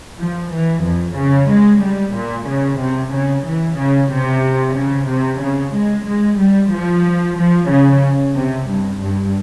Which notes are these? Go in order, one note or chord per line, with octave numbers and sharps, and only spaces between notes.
F3
E3
F2
C#3
G#3
G3
A#2
C#3
C3
C#3
E3
C#3
C3
C#3
C3
C#3
G#3
G#3
G3
F3
F3
C#3
C3
G2
G2